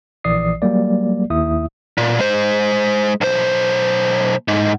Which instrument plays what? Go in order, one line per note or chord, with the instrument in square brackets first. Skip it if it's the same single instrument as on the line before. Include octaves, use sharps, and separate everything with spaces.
[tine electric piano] A#1 E3 D5 D#6 C7
F#3 G3 A#3 D5
D#2 E4 E5 D#6
[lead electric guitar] A#2
G#3 C5
B1 C5
G#2